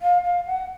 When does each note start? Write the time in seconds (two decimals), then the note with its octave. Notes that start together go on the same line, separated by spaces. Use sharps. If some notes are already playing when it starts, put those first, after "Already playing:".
0.02 F5
0.24 F5
0.46 F#5